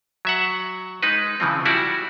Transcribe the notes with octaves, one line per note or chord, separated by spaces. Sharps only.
F#3 E5 F#5
G#3 D#4 B4
C#3 E3 F3 C4
G3 E4 F#4 D5